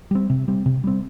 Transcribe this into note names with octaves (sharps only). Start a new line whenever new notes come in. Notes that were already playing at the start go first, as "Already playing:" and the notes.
G3 C4
C3
G3 C4
C3
G3 C4